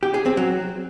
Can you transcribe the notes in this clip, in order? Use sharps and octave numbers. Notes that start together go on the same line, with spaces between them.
G4
G#4
C4
F#3